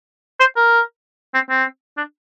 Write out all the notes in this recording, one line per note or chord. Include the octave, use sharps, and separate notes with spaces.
C5
A#4
C4
C4
D4